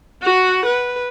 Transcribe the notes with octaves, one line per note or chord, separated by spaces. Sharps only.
F#4 F#5
B4